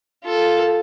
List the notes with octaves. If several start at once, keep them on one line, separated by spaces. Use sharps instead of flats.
F4 A4